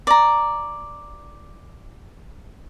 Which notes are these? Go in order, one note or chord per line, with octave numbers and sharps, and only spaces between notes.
D5 A#5